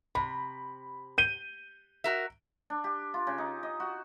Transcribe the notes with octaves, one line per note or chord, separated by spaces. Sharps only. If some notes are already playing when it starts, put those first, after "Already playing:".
C3 B5
G6 D#7 G7
F#4 A#4 E5
D4
G4
F4
C#3
D#4
D#5
F#4